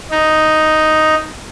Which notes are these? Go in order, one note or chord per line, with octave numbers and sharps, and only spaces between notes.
D#4